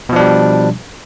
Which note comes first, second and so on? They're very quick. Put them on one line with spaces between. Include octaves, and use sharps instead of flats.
B2 F3 D4 G3